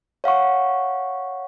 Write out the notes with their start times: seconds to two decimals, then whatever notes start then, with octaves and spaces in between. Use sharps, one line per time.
0.24 C#5 F5 F#5 C#6